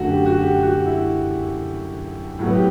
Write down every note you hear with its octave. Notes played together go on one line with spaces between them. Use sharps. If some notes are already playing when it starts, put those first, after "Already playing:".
Already playing: F#2 D3 A3 F#4
G4
F#4
G4
F#4
E4
A2 F#3 B3
G4